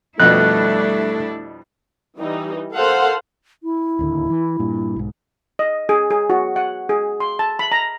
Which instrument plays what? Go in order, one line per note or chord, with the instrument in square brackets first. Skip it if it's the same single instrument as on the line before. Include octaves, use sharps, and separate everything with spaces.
[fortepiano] F2 B2 B3 [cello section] G3 D4 E4 [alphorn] A3 [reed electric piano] F#6
[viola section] E3 G3 D#4
A4 A#4 C5 F5 F#5
[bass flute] E4
[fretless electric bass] D1 D#2 D3
E3
G2 A#2
B1 G#2
[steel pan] D#5
G#4
G#4
F#4
F#5
G#4
C6
A5
B5
A#5